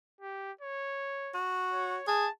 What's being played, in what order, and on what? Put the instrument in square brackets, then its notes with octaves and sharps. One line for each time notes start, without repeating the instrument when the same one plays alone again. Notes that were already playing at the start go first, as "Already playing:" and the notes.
[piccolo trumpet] G4
C#5
[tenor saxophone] F#4
[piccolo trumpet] C#5
[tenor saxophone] G#4 [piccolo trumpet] A5